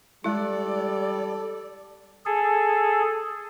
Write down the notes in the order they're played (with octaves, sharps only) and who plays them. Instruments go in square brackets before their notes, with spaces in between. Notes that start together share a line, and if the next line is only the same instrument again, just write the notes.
[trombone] G3 [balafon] G#3 E4 [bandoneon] A4 [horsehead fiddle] D5
[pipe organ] G#4 A4